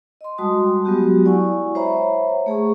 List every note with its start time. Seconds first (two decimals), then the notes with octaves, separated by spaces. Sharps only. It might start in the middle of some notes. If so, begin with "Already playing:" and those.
0.21 D#5 C6
0.38 G3 G#3 F#4 A5 C6 D#6
0.85 F#3 G#3 B3 F#4 G4
1.25 E4 D5 F#5 G#5 C#6
1.75 C5 C#5 E5 F#5 A#5 B5
2.46 A3 G#4 A#5 C#6